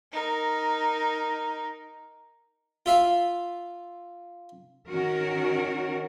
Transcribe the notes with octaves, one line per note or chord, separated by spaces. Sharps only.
D#4 A#4
F4 E5 F5
D#3 C#4 F#4 A#4